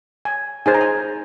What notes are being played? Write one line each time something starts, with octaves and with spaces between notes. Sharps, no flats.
G#5
D#4 G#4 C5 G#5
A#5
G#5